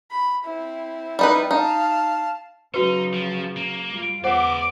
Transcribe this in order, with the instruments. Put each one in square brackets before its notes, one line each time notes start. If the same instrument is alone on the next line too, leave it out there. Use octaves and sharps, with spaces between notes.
[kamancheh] B5
C4 E4
[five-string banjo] G3 D#4 B4
[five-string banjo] D#4 [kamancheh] F5 A5
[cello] C#3 F#3 [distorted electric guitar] D#4 [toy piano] F#4 B4
[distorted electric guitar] F3
A#3
[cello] G3 F4
[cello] E2 [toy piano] C5 F#5 [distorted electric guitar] D5 E5 [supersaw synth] D6